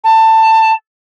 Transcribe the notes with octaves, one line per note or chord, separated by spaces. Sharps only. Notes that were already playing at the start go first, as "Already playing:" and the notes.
A5